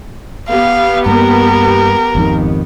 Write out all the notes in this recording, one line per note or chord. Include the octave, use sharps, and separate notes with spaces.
B3 G4 F5
G2 A#3 A#4
G#1 F2 D#3